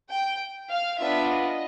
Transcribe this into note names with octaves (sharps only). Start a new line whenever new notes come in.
G5
F5
B3 D4 F4 E5
D#5